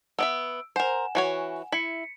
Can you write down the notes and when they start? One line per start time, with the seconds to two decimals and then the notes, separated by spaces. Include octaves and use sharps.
0.19 B3 D#5 E5 E6 D7
0.76 A#4 C5 F#5 G#5 E7
1.15 E3 F#4 C#5
1.72 E4 B6 C#7